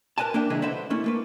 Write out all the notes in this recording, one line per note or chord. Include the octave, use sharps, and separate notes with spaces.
A#4 B4 D#5 G#5 A5
A#3 D4 A#4 E5 G5
B1 C#3 E3 G#3 E4 D#5
A4 B4 C5 D#5 E5 F#5
A3 A#3 C#4 E4
A3 A#3 B4